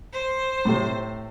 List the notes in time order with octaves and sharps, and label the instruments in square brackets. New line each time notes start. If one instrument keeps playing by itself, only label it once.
[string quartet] C5
[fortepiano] A2 C3